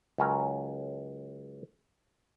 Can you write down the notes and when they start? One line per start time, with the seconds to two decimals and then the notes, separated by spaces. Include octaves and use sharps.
0.18 C#2 F#3 C#4 A#4